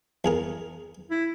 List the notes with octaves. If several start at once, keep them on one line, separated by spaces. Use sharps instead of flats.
E2 G#4 A#4
E4